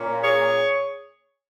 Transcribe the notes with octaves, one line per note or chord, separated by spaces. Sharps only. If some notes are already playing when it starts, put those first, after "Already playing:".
Already playing: A#2 A#3 C#4
G#4 C#5